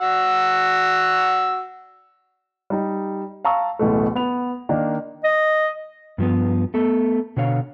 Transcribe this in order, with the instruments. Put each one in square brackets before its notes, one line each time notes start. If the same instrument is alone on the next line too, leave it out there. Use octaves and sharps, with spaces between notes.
[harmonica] F#4 F#5 E6
[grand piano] G3 D#4
F5 A5 A#5 C#6 E6
D1 A1 B2 A3
B3 F7
D#3 A#3 D4
[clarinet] D#5
[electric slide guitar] G2 F3 B3
A3 B3 A4
B2 D3 C#5 F5